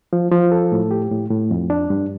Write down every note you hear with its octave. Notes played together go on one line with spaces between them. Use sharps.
F3
F3
A4
A2
G4
A2
A2
F2
D4
G2